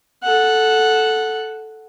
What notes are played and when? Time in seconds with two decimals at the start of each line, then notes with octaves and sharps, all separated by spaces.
0.24 A4 F#5